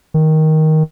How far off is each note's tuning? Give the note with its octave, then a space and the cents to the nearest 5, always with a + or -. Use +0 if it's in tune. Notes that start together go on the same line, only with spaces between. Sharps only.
D#3 +10